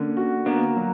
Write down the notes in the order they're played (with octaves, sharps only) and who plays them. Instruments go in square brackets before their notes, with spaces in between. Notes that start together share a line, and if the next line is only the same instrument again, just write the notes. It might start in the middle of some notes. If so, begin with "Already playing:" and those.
Already playing: [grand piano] D3 [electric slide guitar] A#3 C#4
[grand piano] F#4
[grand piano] A#3 [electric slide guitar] B3 D4
[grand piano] F#3